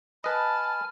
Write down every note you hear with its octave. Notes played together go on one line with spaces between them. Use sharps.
B4 D#5 G#5 A5 B5 F6